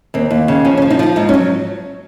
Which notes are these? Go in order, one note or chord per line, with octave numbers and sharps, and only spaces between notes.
D#2 C4
D#2
C#3
F3 C#4
C#4
F3
D#4
F3 F4
G#2 D#4
C#4
F#3